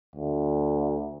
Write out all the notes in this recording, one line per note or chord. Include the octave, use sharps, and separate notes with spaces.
D2